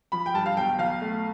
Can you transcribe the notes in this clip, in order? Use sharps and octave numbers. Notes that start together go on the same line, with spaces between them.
F3 B5
G5
G2 A5
F5
B1 G5
B1 F5
A3